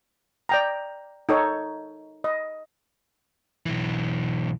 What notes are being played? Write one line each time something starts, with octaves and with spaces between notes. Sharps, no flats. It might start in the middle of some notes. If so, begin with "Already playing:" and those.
D5 G5 A#5
D#4 A4 C#5
D#5
B1 E3